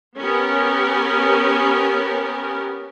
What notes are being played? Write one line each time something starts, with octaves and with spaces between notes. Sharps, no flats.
B3 C#4 G4 A#4